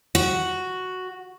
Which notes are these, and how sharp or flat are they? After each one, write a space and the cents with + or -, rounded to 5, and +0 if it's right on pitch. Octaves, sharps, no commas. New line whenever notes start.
F#4 +0